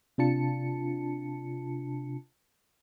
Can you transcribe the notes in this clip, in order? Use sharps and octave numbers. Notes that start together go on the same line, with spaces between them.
C3 D4 F4 A5 C#7